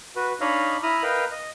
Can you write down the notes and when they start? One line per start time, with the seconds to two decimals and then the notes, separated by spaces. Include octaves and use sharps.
0.16 F#4 B4
0.41 D4 D#4 C#5 D#5 F5 B5
0.83 E4 A#5 B5 D#6 F6
1.03 A#4 B4 D#5 F5 G5
1.31 D#5